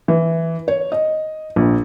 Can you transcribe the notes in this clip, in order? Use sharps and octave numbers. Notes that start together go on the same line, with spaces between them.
E3
C#5
D#5
A#1